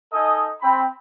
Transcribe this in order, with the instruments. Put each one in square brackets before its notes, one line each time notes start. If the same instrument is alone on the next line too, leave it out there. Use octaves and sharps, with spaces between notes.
[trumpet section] D#4 A4 D#5 G#5 D#6
C4 B5